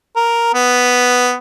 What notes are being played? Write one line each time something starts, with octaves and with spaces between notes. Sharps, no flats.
A#4
B3